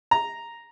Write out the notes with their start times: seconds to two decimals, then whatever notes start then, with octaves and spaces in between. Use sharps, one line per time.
0.11 A#5